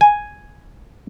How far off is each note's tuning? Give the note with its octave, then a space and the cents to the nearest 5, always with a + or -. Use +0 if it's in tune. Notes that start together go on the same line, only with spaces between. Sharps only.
G#5 +0